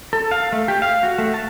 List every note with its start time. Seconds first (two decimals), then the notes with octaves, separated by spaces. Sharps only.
0.13 A4
0.31 F5
0.52 A3
0.68 G4
0.82 F5
1.03 F#4
1.18 A3
1.34 A5